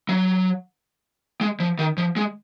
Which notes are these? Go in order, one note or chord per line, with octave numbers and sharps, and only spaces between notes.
F#3
G#3
F3
D#3
F3
G#3